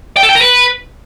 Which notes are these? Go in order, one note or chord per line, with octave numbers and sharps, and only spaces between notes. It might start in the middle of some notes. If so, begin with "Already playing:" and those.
G5
A4
G5
A#4
B4